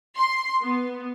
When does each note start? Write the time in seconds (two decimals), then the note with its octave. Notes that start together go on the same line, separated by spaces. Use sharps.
0.18 C6
0.62 B3